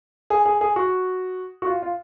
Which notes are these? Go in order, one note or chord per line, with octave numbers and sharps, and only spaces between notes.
G#4
G#4
G#4
F#4
F#4
F4
F4